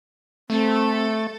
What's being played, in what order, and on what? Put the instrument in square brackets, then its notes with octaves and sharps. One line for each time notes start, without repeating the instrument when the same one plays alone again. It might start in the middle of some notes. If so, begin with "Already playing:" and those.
[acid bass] A3 [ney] C4 [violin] A4 A5